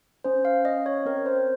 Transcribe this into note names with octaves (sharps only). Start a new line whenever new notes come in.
C#4 C5
F5
C#4 D#5
C#5
C4 A#4
C5